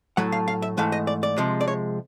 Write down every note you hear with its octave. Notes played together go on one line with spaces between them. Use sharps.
A2 F#3 A3 F#5
F5
F5
E5
G#2 E3 A3 F5
D#5
D5
D5
C3 F3 G#3
D5
C#5